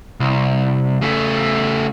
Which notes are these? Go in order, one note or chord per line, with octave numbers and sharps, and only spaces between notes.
C2
C#3 A3